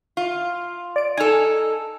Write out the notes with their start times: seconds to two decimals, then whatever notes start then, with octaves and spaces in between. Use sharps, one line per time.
0.17 F4
0.96 D5 D7
1.17 D#4 A4 G#5 F6